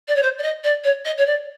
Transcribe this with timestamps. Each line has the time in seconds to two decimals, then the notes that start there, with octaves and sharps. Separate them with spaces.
0.08 D5
0.15 C#5
0.22 C5
0.38 D5
0.42 D#5
0.63 D5
0.84 C#5
1.05 D#5
1.17 C#5
1.26 D5